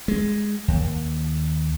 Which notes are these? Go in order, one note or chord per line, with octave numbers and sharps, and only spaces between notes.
G#3
D#2